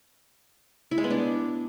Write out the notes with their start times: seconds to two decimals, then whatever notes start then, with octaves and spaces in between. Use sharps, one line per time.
0.91 E4
0.98 G#3
1.04 B3
1.10 D4